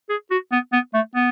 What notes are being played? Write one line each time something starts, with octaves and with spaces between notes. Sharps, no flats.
G#4
F#4
B3
B3
A3
B3